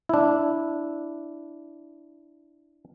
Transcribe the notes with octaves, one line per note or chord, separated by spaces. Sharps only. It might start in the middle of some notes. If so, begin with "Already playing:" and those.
D4 E4